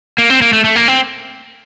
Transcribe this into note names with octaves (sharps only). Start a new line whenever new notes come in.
A#3
C4
A#3
A3
A3
A#3
C4